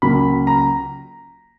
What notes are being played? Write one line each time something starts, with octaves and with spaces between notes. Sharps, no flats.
C#2 C#3 F#3 A#3 B5
A#5